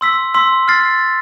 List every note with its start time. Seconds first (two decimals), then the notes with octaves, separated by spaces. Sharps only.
0.01 C6 E6 B6
0.34 C6 E6 B6
0.68 F6 A6 C7